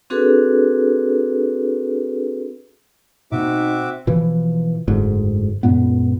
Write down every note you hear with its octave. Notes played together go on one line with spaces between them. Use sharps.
C4 D4 F#4 G#4 A4 B4
B2 A#3 C4 D#4 F#4 E5 D6
B2 E3 F3
F#1 D2 G#2
C#2 F#2 A#2 B3